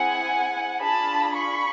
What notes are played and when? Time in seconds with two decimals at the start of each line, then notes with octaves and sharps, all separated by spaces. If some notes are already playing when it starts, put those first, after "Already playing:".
Already playing: C4 E4 G#4 F#5 G#5
0.81 D4 F4 G#4 A5 B5
1.36 B5 C#6